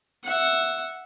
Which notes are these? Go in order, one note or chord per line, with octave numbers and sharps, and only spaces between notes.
E5 F#5